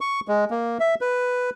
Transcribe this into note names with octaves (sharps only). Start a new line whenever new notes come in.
C#6
G#3
A#3
E5
B4